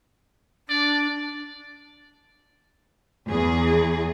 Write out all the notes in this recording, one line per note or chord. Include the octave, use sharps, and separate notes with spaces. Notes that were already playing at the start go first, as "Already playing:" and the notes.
D4 D5
E2 G#4